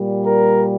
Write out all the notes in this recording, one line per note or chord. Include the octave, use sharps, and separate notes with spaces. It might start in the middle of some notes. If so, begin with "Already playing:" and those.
Already playing: A#2 G3
A#4